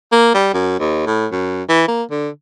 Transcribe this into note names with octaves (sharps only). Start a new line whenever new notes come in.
A#3
G3
F#2
D#2
A2
F#2
E3
A#3
D3